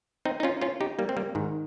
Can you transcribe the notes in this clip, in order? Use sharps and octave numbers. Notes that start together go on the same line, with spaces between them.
C4 D#4
D#4
C#4 F4
C#4 F4
D#4 G4
G3 A#3
C4
G3 A#3
G#2 D#3